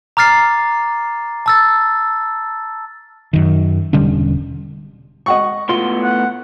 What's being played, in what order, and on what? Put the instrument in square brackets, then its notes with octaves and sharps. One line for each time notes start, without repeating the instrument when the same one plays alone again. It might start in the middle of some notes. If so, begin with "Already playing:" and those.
[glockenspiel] A#5 D6 F6 A6 C7
A5 E6 A6
[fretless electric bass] F#2 D#3
E1 D3 G3 C#4
[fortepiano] D#5 F#5 C#6
[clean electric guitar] A2 B3 C6 [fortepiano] F4
[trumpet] F#5